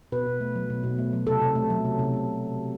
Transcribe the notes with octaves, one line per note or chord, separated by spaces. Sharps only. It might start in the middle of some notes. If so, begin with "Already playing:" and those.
B2 B4
B2
A3
F#3
B2
B2
A3
F#3
C3 A4
C3
A3
F#3
C3
C3
A3